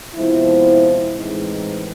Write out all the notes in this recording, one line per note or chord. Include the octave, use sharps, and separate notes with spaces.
C3 F3 G#3 B3 E4
A2 E3 G#3 C4 D#4